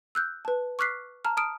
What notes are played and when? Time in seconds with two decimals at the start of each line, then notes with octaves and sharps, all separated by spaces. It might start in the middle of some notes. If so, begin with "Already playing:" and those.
0.15 E6 F#6 G6
0.45 B4 A5
0.79 C#6 D6 F6 F#6 B6 C7
1.25 A5 A#5 F6
1.37 A5 D#6 F6 D7